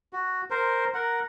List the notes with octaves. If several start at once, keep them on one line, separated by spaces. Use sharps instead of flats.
F#4
A#4 C5
A#4 F#5